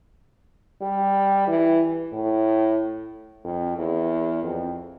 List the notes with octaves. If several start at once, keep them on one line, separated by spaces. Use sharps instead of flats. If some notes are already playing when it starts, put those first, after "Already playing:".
G3
E3
A2
F2
E2
F2